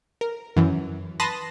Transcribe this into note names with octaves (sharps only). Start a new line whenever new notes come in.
A#4
F#2 E3
B4 A5 B5 C6 D#6 A#6